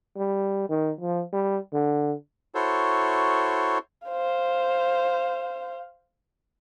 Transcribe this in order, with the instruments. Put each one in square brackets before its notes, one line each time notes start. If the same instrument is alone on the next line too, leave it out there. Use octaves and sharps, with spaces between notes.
[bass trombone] G3
D#3
F3
G3
D3
[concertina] E4 F#4 A4 C5 C#5
[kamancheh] C5 F5